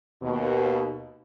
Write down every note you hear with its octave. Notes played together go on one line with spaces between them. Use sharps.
D#2 B2